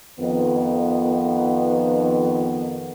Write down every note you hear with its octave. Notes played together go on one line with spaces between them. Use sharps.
F2 D#3 B3